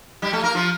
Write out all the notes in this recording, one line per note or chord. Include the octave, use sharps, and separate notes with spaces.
G3 G4
A3 A4
A#3 A#4
F3 F4